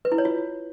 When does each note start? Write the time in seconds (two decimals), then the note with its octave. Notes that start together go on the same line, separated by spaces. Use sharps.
0.05 B4
0.12 E4
0.18 C#5
0.25 F4